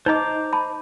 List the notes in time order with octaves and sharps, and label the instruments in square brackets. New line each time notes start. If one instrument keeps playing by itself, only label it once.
[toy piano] D#4 D#5 [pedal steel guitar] C5 A#5 D6
[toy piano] A5 B5